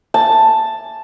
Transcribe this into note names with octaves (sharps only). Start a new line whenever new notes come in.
A5